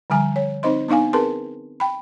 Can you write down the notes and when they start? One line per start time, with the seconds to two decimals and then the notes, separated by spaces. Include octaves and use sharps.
0.10 D3 F3 G3 G#5 A#5
0.36 C#5
0.63 C4 D#4 C5 D#5 C6
0.88 B3 D4 D#4 F5 G#5
1.13 C4 G#4 A#4 B4 A5 C6
1.80 G5 B5